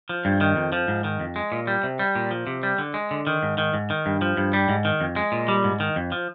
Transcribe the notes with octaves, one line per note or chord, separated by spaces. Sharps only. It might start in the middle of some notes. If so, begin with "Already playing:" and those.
F3
G2
D#3
F2
F3
G#2
D#3
F2
G#3
A#2
G3
C3
G3
A#2
F3
C3
G3
D3
G#3
D3
D#3
G#2
D#3
G#2
D#3
G2
F3
G2
G3
G#2
D#3
F2
G#3
A#2
G3
G#2
D#3
F2
F3